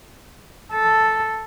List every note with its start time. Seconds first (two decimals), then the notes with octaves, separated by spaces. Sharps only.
0.73 A4